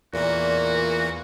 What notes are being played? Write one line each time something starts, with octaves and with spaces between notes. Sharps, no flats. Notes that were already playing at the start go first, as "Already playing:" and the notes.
E2 A#2 E3 A#3 F#4